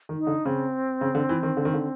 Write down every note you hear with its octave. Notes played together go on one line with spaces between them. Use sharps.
D#3
D#4
D3
C#3 C4
C#3
D3
E3
D#3
D3
D#3
D3